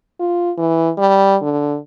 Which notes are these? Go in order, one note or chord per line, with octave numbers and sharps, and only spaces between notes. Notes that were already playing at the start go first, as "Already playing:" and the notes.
F4
E3
G3
D3